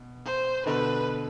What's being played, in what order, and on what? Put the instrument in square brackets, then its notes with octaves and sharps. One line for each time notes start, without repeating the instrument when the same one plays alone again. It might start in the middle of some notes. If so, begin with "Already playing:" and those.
Already playing: [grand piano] B2
[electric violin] C5
[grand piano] B2 D3 [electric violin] B4